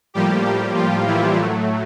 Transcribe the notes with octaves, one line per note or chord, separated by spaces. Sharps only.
A2 F3 G3 A#3 G4
G3 G4
F3 F4
E3 E4
A2 F#3 A3